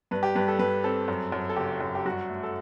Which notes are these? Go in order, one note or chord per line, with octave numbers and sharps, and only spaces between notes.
G2 B4
G4
G2 B4
A4
G2 B4
C4 A4
F#2
F#2
A4
F#1 G4
F#2
G4
G2 F#4
A3
A4